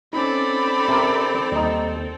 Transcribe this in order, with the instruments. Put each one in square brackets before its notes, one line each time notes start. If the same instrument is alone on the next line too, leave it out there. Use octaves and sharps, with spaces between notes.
[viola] C4 A4 [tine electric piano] C#4 D#4 [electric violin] D5 B5
[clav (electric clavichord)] C3 A#4
[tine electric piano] D#2 [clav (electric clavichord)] G3 D#4